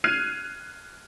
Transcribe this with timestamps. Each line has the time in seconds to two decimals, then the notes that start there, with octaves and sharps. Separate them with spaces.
0.04 F6 F#6 G#6 C7 D#7 F7